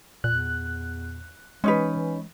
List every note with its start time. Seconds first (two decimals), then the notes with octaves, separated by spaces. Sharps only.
0.24 E2 A#2 F#6
1.64 E3 G#3 C#4 D#4 B4